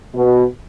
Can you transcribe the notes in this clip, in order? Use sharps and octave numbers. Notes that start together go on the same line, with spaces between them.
B2